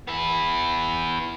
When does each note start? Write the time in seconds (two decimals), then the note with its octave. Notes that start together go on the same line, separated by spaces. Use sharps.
0.07 B3 E4